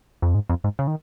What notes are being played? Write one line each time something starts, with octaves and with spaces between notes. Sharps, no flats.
F2
G#2
F2
G#2
C#3
D#3